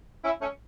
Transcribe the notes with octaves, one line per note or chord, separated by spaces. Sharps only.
C#4 E4
A3 C#4